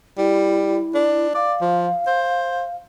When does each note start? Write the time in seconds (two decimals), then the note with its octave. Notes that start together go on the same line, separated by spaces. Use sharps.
0.18 G3 E4
0.95 D4
1.35 D5 F5
1.61 F3
2.07 C5